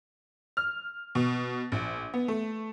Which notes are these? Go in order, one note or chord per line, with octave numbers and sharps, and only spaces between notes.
F6
B2
A#1
B3
A3